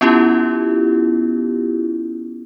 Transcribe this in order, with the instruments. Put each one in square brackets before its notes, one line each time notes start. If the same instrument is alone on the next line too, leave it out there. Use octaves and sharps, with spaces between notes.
[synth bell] B3 C#4 E4 F4 G4